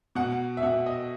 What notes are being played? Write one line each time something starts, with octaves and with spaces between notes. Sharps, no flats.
B2 F#5
E5
B2 F#5
D#5